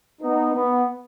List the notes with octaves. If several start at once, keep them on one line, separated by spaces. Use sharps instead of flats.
B3 D#4
B3